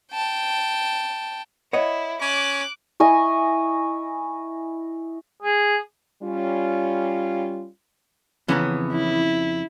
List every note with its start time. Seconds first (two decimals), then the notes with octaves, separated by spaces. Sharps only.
0.12 G5 A5
1.73 E4 C#5 D#5 F#5
2.22 C#4 D6 F#6
3.00 E4 D#5 G#5 C#6
5.43 G#4
6.22 G3 C#4 F4
8.48 F2 C#3 E3 B3 C#4 A#5
8.92 E4